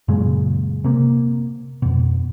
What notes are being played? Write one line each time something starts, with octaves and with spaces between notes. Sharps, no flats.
F#2 A#2 C#3 G#3
C3 A#3
F2 B2